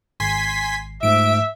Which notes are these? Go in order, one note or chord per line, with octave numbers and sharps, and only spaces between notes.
G#1 G#5 C6 B6 C7
G#2 F3 A3 E5 D7